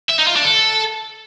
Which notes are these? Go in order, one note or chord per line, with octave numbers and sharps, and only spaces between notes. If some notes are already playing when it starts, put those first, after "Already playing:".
E5
D#4
F4
D4
A4